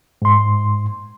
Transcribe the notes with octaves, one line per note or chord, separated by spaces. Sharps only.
G#2 C6